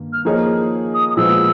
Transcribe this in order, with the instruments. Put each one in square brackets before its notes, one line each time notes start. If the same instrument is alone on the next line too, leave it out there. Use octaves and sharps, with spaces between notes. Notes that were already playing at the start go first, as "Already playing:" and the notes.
Already playing: [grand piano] G2 D#3 A#3
[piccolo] F6
[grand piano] F3 A#3 D#4 G#4 C#5
[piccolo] D#6
D#6
[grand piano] A#2 F3 G#3 B3 [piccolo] E6